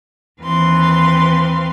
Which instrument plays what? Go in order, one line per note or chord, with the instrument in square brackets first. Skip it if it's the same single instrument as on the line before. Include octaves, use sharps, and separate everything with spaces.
[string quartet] D#2 E3 C4 B4 F5 C6